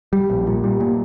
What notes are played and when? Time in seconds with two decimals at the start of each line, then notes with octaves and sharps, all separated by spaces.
0.13 G3
0.30 A#1
0.47 A#2
0.64 G3
0.80 A#2